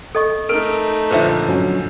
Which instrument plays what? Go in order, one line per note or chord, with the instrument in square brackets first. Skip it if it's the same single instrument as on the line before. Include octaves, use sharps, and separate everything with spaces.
[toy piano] A4 D#5 C#6
[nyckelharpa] A3 D#4 [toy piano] A#4 [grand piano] F6 D7
[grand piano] A#2 D3 F3 [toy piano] B4 C5 E5
[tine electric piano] G2 F#3 C#4